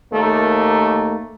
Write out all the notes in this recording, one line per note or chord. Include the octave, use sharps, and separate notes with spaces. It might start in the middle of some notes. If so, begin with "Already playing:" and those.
D#2 A3 A#3